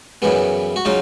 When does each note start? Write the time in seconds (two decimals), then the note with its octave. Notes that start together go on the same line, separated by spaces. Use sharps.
0.22 F#2 C#3 E3 G3 B3
0.76 F#4
0.85 C#3 F#3 D#4 F4